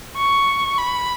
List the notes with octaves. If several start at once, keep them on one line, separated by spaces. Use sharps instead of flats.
C#6
B5